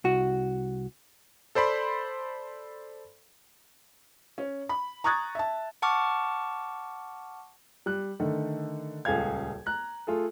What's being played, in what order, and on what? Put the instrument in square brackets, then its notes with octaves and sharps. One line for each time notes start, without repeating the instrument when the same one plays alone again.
[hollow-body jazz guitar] C2 F#4
[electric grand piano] A4 C5 D5 B5 C6
[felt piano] C#4
B5
A#5 C#6 D#6 F#6 G#6 A6
E5 A5
[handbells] F#5 A5 C#6 D6 F6
[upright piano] G3 F#6
D3 D#3 A3
D#1 C#2 G#4 A4 F5 G#6
A#5 F#6
A3 F4 G#4 A4